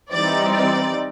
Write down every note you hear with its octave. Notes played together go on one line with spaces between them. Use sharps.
E3 G3 C4 D#4 D5
D5